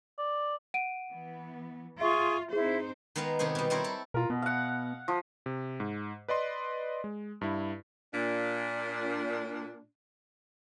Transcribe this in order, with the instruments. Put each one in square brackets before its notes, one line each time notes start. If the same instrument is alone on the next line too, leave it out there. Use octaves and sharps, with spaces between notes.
[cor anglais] D5
[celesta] F#5 D7 D#7
[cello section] E3 B3
[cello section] F4 [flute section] G#4 C6 C#6 [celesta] E5
[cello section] C4 D#4 C5 [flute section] E4 [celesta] G#4
[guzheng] D#3 G#3 B3 A#4 F5
C3 D#3 B3 G#4 C5
B2 G3
G3 C4 E4 A#4 C5 C#5
A4
[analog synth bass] B2 [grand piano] F4 A#4
[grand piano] B2 [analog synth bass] B3
[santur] F5 F#5
F3
[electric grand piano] C3
G#2
B4 D5 D#5 C6
G#3
G2 E4
[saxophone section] A#2 D4